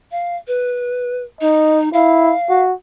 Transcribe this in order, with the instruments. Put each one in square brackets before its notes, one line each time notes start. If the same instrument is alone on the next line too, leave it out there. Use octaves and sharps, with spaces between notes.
[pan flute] F5
B4
[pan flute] D#4 [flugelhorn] D#5
[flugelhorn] E4 [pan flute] F5
[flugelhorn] F#4